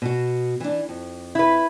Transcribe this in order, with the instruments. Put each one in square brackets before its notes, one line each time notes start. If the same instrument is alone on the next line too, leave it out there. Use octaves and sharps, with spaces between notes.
[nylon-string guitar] B2 F#4
E3 D4
F2
[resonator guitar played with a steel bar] E4 B4